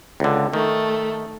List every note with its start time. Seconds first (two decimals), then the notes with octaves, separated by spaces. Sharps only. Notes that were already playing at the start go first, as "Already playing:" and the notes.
0.20 C#2 D3
0.53 D#3 A3